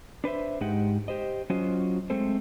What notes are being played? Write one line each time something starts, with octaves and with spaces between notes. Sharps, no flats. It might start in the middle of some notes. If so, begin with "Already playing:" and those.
D4 B4 C5 E5
G#2 G#3 D#4 G4 F#5
G4 C5 D#5
F#3 C#4 F4 F#4 C5 D#5
G#3 A3 C4 A4 C5